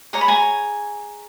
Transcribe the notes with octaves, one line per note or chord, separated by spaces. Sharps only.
G#4 C#5 A#5
B5
G#5 A#5